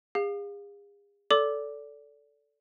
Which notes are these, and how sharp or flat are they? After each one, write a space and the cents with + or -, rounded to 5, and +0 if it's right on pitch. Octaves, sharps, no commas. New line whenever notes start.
G#4 -40 F5 +20
A4 +0 D5 -25 D6 +0